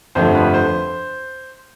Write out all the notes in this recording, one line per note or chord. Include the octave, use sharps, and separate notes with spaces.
G1 F2 C3 F3 A3 C5
B4
C5